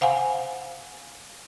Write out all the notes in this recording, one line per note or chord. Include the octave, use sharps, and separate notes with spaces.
C5 F5 F#5 G#5